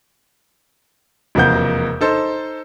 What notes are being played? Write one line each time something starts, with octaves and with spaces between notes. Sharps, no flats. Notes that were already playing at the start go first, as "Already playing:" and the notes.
E1 F2 C3 A#3 F#5 G6
D#4 A4 C5